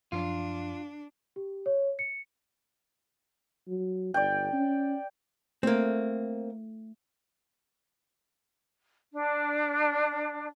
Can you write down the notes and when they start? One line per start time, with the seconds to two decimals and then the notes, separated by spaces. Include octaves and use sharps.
0.12 F#2 F3 D4 F4
1.36 G4
1.66 C#5
1.99 C#7
3.68 F#3
4.14 G1 D5 G5
4.53 C#4
5.63 A3 A#3 C4
9.14 D4